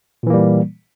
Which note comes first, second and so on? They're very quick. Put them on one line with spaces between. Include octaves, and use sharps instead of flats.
A#2 E3 A#3 G3